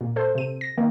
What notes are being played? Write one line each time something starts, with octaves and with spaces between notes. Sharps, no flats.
A#2
A4 C5
C3 D#7
A#6
D#3 A#3